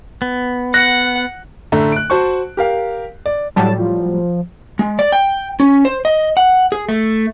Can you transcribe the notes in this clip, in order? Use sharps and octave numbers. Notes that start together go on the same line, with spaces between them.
B3
F#5 F#6 A#6
A2 D3 A3 D4 E5 A#5
F#6 D7
F#4 C5 A5 C#6
G4 A#4 F5
D5
A2 F#3 G3 A5
F3
G#3
D5
G5
C#4
C5
D#5
F#5
G#4
A3